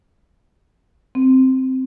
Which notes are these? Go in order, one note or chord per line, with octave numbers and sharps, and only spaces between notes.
C4